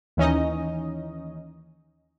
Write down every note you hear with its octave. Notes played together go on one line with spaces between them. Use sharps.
D#2 E3 C#4 D#4 D#5